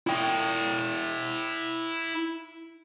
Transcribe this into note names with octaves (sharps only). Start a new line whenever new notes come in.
E4 G5